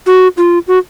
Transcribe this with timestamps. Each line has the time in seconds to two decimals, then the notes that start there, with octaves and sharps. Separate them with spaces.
0.06 F#4
0.37 F4
0.68 F#4